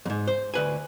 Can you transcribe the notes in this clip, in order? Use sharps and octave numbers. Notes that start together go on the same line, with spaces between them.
F2 G#2
C5
D2 B4 G#5